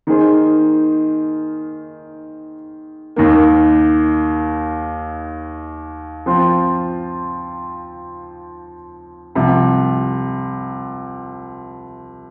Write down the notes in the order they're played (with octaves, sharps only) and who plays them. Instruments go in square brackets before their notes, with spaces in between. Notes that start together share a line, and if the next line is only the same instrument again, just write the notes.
[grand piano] D#3 A#3 D#4 G#4 C5
D#2 D#3 A#3
F3 C4 F4
C2 C3 F3